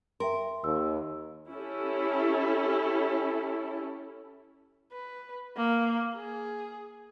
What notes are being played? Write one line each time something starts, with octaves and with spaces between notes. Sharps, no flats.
A#4 E5 G5 C6
D#2 E6
C#4 E4 G4 A4
B4
A#3
G#4